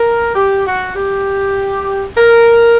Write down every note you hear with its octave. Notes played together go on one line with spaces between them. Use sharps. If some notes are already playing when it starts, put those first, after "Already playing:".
Already playing: A#4
G4
F#4
G4
A#4